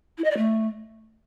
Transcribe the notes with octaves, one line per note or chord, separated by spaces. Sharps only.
E4
D#5
D5
A3